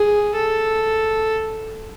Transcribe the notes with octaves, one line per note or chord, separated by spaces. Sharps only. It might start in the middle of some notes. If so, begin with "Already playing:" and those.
Already playing: G#4
A4